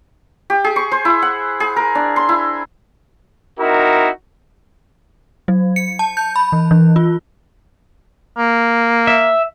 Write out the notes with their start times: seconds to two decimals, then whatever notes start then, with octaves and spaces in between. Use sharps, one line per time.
0.50 G4
0.64 G#4
0.76 C#6
0.92 C5
1.05 E4
1.22 F#5
1.60 G#4
1.76 A#4
1.95 D4
2.16 C6
2.29 E4
3.59 C4 D#4 E4 F#4 A#4
5.48 F#3
5.76 C#7
5.99 A5
6.17 G6
6.36 B5
6.52 E3
6.71 E3
6.96 F4
8.38 A#3
9.07 E5